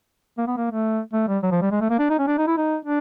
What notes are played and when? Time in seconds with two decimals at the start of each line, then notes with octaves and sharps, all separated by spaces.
0.38 A#3
0.47 B3
0.57 A#3
0.70 A3
1.13 A3
1.28 G3
1.43 F#3
1.51 F3
1.62 G3
1.71 G#3
1.81 A3
1.90 A#3
1.99 D4
2.10 D#4
2.19 C#4
2.27 D4
2.38 D#4
2.47 E4
2.57 D#4
2.85 D4